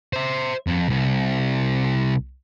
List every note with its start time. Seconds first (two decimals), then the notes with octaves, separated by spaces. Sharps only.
0.13 C5 E5
0.67 F2
0.89 C2